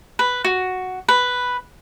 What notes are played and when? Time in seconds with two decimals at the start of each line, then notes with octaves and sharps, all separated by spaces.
0.19 B4
0.45 F#4
1.08 B4